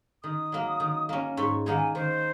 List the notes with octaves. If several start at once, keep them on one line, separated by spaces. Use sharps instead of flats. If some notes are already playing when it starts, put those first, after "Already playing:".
D#3 D#6
F#3 A#3
D#3
A#3 C#4
G#2 C#6
D#3 A#3 D#4 G#4 F#5
G#5
D#3 C5